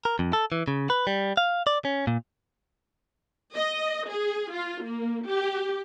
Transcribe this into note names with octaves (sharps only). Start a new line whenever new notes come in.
A#4
F2
A4
E3
C#3
B4
G3
F5
D5
C#4
A#2
D#5
G#4
F4
A#3
G4